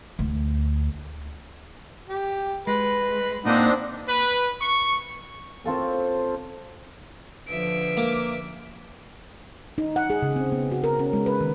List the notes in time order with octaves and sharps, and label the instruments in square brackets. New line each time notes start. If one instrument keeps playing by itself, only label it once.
[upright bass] D2
[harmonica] G4
[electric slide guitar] G#3 [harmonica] B4
[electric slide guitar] A#2 A#3 [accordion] C4 D4 [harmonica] D#4 F#5
[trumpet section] B4
C#6
[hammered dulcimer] C4 F4 A4 C#5
[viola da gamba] D3 F3 [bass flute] B4 [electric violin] E5 D7
[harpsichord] A#3 D6
[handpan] D#4
F#5
G#4
C#3
C4
B3
F#4
A#4
C#4
G#3
B4
D#3